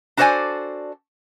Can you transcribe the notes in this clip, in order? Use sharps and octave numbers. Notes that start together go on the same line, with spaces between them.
D4 F#4 A4 C5 D5 G#5